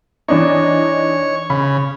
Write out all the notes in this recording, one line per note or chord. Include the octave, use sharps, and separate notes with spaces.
E3 D4 D#4 C#5
C#3 B5